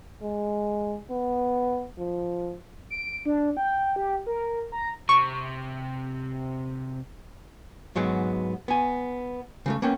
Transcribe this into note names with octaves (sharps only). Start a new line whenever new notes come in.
G#3
B3
F3
D7
D4
G5
G4
A#4
A#5
C3 C#6
G#2 F#3 G#3 B3
B3 G#5
C#3 F3 A3
A#3 B3 C#4 G5